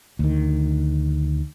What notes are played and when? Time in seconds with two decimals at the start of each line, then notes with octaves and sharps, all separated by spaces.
0.19 D2 D#3